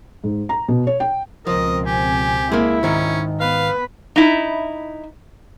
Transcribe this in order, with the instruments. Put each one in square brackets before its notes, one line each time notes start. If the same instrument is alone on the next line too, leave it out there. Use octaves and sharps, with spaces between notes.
[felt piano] G#2
A#5
B2
C#5
G5
[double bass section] C#2 B2 C4 [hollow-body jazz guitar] F3 [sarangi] A#4 [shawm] D#5
[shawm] G4 [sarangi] G#5
[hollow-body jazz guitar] G#3 A#3 [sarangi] E4
[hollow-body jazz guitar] G#2 D#3 D#4 [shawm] C#4
[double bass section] B3 [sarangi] B4 [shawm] F5
[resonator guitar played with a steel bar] D#4 E4